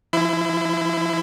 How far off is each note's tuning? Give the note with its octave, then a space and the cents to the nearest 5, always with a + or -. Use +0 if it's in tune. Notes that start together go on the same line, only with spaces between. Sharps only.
F3 -35 E4 +0 B5 +45